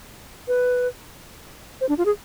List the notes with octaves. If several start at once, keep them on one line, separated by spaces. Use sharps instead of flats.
B4
C5
D4
F4
G#4